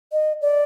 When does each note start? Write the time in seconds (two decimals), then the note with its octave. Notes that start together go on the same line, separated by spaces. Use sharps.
0.12 D#5
0.42 D5